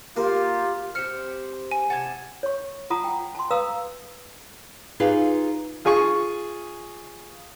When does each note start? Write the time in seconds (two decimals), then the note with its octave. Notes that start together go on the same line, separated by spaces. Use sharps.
0.17 A#3 F4 G4 A#4
0.95 C4 G4 F6 C#7
1.71 G#5
1.90 C3 F#5 A5 G#6
2.43 C#5 C#6
2.90 F4 F#5 A5 A#5 D#6
3.04 F#5 G5
3.35 A5 C6
3.51 B4 F5 A#5 D#6 E6
5.00 D#4 F4 G4 G#4 B4 F5
5.85 F4 G#4 G#5 C#6